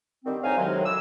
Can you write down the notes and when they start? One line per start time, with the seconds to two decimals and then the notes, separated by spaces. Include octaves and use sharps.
0.25 D3 D#3 G3 C4
0.43 C2 A2 C3 D#4 F5 G#5
0.57 F#2 A2 C3 D#3 F#3 G#3
0.84 G3 E6